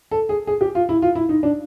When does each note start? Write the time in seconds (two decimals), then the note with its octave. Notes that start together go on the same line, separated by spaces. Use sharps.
0.11 A4
0.29 G#4
0.47 G#4
0.61 G4
0.75 F4
0.89 E4
1.02 F4
1.15 E4
1.29 D#4
1.43 D4